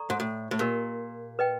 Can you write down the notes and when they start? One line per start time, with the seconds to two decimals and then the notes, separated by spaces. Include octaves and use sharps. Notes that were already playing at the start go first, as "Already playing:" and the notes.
Already playing: A4 D5 A#5 C#6
0.10 G#2
0.20 A2
0.51 A2
0.59 A#2 G4 A#4 D#5
1.39 B4 D#5 G5